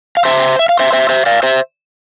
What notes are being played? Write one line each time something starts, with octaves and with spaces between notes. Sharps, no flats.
F5
C5 E5
E5
F5
C5 E5
C5 E5
C5 E5
D5 F5
C5 E5